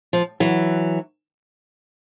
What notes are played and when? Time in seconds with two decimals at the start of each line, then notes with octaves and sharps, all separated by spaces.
0.13 F3
0.40 E3 F#3